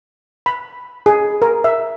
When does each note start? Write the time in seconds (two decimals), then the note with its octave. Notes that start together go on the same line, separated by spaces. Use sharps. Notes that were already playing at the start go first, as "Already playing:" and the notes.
0.46 B5
1.06 G#4
1.42 A#4
1.64 E5